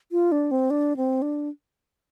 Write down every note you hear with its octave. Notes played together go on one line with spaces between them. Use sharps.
F4
D4
C4
D4
C4
D4